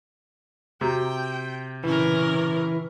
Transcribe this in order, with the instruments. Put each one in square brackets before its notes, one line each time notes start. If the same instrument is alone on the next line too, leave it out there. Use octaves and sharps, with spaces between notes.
[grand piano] C3 [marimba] F#4 A#5 [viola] G5
[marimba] A#2 C#3 E4 [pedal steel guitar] E3 [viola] C#4 A#4